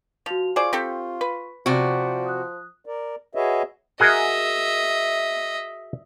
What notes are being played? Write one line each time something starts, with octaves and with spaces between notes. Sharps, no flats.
F3 F#4 F7
F4 G#4 C5 D5 C#6
C4 G4 A4
B4
C3 F3 F#4 D5 A6 D7
D#6 F#6
A#4 D5
F#4 G#4 B4 C#5 D#5 E5
F#4 G#4 A#4 D#5 E5